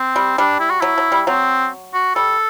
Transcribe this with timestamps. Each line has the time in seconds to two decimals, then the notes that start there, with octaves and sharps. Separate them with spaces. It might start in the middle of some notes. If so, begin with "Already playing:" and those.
Already playing: C4
0.16 G3
0.38 G3 D4
0.60 E4
0.71 F#4
0.81 F#3 E4
0.98 F#3
1.12 G3
1.27 F#3 C4
1.94 F#4
2.15 G3 A4